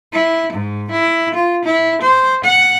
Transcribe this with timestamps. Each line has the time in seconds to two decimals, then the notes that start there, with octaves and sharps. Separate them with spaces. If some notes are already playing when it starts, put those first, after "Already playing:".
0.13 E4
0.53 G#2
0.91 E4
1.35 F4
1.65 E4
2.02 C5
2.44 F#5